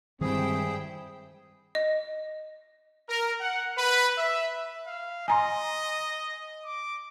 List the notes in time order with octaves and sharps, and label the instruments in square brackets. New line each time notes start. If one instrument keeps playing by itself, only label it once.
[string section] G2 E4 G5 [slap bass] D#3 G3 G#3 [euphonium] C4 [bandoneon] G#4
[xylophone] D#5
[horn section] A#4
F#5
B4
E5
[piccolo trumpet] F5
[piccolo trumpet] D#5 [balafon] G#5 A#5 C6
[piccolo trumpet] D6